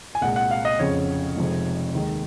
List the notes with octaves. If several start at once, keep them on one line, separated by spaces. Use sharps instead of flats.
G#5
C2 A#2 G#3 F#5
F#5
F5
D#5
F1 F2 C#3 F3 C#5
F1 F2 C3 F3 G#3
D#2 D#3 G#3